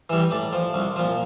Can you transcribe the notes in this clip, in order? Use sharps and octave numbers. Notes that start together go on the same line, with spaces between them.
E3 G3
A2 D5
F3
C2
A#2 F3